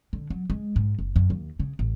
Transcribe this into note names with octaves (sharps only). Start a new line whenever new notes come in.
D3
F#3
G#3
G#2
F#1
F#2
D#2
C#3
A1